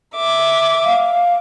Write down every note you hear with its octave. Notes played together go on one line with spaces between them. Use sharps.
E5 D6
F5